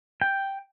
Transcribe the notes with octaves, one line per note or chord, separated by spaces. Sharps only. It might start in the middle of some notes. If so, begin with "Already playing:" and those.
G5